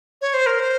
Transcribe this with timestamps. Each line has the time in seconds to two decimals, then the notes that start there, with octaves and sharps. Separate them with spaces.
0.21 C#5
0.34 C5
0.46 A#4
0.60 C5